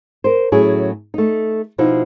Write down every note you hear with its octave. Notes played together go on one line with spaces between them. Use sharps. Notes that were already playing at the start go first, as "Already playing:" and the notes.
A#4 C5
A2 F#3 C#4 E4 G#4
A3 D#4
B2 F3 D#4 E4